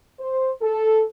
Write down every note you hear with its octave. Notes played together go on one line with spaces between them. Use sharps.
C5
A4